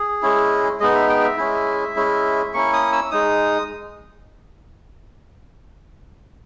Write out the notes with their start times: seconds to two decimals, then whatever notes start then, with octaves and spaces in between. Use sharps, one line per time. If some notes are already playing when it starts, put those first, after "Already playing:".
Already playing: G#4
0.22 G#3 C#4 E4
0.80 G#3 B3 D#4 D#5
0.95 E5
1.09 G5
1.19 G5
1.24 E5
1.38 G#3 C#4 E4
1.96 G#3 C#4 E4
2.54 A#3 C#4 E4 C#6
2.73 D#6
2.92 E6
3.11 G#3 D#4 D#6